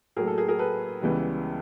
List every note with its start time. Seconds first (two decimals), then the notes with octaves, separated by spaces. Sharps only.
0.16 A2 F#3 A#3 G#4 A#4
0.27 A4
0.38 G#4 A#4
0.48 G#4 A#4
0.59 A4 B4
1.01 C#2 C#3 E3 G3 B3